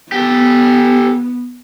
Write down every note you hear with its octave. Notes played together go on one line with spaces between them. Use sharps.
B3 G4 A4